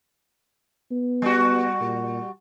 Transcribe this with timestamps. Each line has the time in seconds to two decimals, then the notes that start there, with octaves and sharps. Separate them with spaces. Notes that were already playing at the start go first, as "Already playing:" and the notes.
0.91 B3
1.22 G3 F#4
1.81 A#2